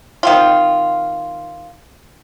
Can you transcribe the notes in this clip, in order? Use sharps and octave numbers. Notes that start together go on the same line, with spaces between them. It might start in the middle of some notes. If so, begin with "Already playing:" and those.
D#3 C4 F4